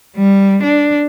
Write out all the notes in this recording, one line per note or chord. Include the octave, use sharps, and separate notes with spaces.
G3
D4